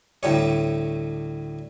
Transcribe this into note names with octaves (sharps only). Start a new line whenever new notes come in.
D2 A2 G3 C#5